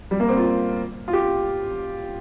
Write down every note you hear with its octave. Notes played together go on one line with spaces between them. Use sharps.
G3
A#3
C4
F4
F4
G4